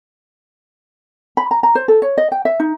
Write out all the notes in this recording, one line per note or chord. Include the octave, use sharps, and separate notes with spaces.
B5
A#5
A#5
C5
A4
C#5
D#5
G5
E5
D#4